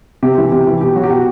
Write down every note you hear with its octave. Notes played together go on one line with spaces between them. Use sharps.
C3 G4
E3
C3 G4
E3
B2 G4
F#3 F#4
G4
B2 F#4